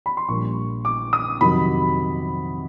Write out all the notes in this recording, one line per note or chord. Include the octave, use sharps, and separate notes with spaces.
B5
C6
A#1 A#2 G3 C#6
D6
D#6
F2 C3 D#3 F#3 B5